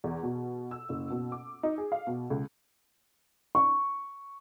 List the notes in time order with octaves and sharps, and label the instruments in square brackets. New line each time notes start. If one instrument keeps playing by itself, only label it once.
[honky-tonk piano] E2
B2
E6
F#1
B2
D6
D#4
G#4
F5
B2
C#2
[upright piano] C#6